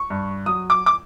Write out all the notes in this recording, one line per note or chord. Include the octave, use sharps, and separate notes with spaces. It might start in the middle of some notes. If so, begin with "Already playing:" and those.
Already playing: C#6
G2
F#3 D#6
D6
D6